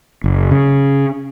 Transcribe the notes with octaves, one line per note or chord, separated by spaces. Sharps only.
F#1
C#3